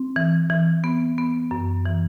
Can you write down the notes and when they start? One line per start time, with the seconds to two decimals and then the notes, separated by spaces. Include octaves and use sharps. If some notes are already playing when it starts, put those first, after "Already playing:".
Already playing: C4
0.16 E3
0.50 E3
0.84 B3
1.18 B3
1.51 F#2
1.86 E3